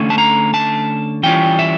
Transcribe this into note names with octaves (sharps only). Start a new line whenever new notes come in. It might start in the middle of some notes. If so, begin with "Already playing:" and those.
Already playing: D3 A3 C#4
A5
A#5
A5
E3 G3 C#4 F4 G5
E5